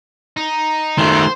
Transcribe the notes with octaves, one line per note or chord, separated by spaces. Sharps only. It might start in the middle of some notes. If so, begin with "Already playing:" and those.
D#4
D#3 A3 C5